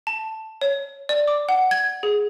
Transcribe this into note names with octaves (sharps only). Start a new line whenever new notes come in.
A5
C#5
D5
D6
F#5
G#6
G#4